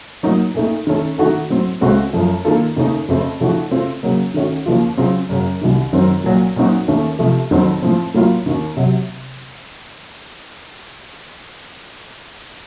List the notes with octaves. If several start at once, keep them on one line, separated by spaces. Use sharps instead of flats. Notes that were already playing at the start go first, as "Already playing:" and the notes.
A2 F#3 A#3 D#4
A#2 A3 D#4
D#3 A3 C#4 A4
D#3 A3 D#4 F#4 A4
A2 F#3 C4
C#2 C#3 A3 C4 F#4
F#2 F3 A3
D#3 A#3 F4 A4
D#2 C#3 A3 D#4
F2 C#3 A3 C4
C#3 F3 A3 D#4 F#4
C#3 A3 C4 F4
C#3 F#3 A#3
D#3 A3 C#4 F#4
D#2 C#3 F3 A#3 F4
C#3 F#3 C4 F4
F#2 C#3 F#3
C2 C3 D#3
F#2 D#3 F#3 C4
C2 A#2 F#3
A#2 F#3 C4 D#4 F#4
D#2 D#3 A3 C#4 A4
C3 F3 A3
F2 D#3 F#3 C4
A2 F3 C4
A2 F#3 A#3 F4
D#2 D#3 A#3
C3 F#3